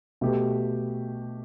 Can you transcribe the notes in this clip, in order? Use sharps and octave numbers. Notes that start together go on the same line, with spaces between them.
B2 A3 G4 B4